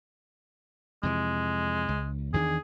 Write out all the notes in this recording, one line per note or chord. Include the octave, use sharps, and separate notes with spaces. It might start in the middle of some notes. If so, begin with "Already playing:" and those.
F2 C3 E3 G#3
C#2
E2 D#3 D4 G#4